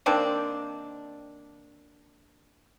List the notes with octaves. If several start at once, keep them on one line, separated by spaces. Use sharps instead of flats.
D#3 A#3 C4 D4